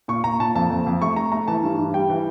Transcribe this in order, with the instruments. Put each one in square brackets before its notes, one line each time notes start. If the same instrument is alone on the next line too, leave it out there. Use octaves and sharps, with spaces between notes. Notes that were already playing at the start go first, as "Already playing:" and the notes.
[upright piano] A#2 C#6
A#2 A#5
A#2 A5
F2 A5
F2
F2
A3 C#6
A3 A#5
A3 A#5
E3 A5
G2
G2
G3 G5
E3